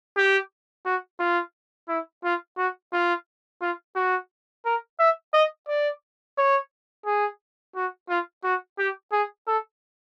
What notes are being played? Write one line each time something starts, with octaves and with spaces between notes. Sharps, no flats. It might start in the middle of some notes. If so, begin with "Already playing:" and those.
G4
F#4
F4
E4
F4
F#4
F4
F4
F#4
A#4
E5
D#5
D5
C#5
G#4
F#4
F4
F#4
G4
G#4
A4